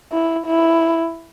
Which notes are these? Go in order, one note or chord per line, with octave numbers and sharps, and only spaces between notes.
E4
E4